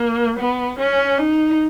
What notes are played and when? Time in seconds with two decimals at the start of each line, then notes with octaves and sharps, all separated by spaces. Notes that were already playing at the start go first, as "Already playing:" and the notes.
Already playing: A#3
0.40 B3
0.79 C#4
1.18 D#4